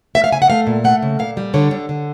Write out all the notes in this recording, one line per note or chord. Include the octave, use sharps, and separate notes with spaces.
A3 E5
F5
C#3 G#5
F#5
A3 F5
A#2
A3 F#5
C#3
A#2 F5
G3
D3 C#5
D3
D3